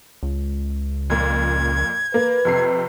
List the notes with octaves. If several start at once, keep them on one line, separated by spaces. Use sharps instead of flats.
C#2
F2 A#2 G#6
A#3 B4
F2 C3 C7